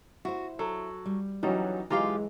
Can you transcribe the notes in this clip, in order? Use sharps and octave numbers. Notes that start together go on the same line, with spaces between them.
E4 F#4 C5
F#3 A4
G3
E3 F#3 G3 C#4 D#4 F#4
B1 E3 G#3 F4 G4 F5 A#5